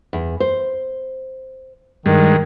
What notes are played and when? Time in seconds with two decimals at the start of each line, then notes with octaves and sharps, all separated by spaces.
0.13 E2
0.40 C5
2.06 G2 D#3 G#3